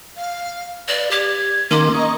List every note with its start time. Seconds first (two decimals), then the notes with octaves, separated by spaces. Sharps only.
0.17 F5
0.88 B4 D5
1.11 G4 G#6
1.71 D#3 A#3 C#4 C6 D6
1.94 D#5 A#5 C#6